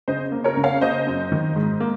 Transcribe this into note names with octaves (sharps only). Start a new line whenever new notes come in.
C#3 C5 D#5
A#3
A#4 C#5
C#3
C#5 F5
A#3 C5 D#5
F#2
D#3
G#2
A#3